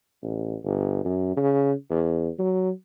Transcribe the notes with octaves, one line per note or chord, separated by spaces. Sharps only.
A1
G1
F#2
C#3
E2
F#3